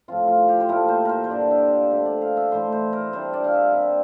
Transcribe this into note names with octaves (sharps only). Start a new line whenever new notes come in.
A2 F3 C4 F4
F4
G4
C5
A#2 A3 E4 A#4
C5
A#4 C5
C5
G2 D3 G3 D4 D5
E5
F5
D3 A3 C4 E5
D5
F5
E5
A2 E3 A3 E4 C5
C5
A#4
C3 G3 D4 C5
D5
F5
E5
C3 G3 A#3 D4 E5